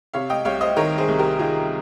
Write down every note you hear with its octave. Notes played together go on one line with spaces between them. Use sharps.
C3 C#5 F5
D#5 G5
C2 C#5 F5
C5 D#5
D#3 A#4 C#5
G#4 C5
C2
G4 A#4
D#3 F4 G#4